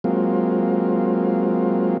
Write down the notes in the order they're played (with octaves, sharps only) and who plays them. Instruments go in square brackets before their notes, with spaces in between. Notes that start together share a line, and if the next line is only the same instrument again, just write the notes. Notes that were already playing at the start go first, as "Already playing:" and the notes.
[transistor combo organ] F#3 G#3 A#3 C4 F4